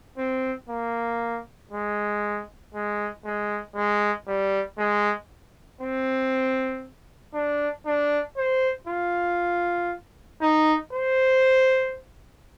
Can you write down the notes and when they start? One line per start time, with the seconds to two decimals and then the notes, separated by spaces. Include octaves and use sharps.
0.18 C4
0.69 A#3
1.71 G#3
2.74 G#3
3.25 G#3
3.76 G#3
4.27 G3
4.78 G#3
5.81 C4
7.34 D4
7.86 D4
8.37 C5
8.87 F4
10.42 D#4
10.93 C5